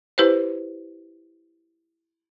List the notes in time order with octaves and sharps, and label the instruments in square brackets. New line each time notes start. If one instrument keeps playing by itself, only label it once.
[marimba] E4 G4 B4 C5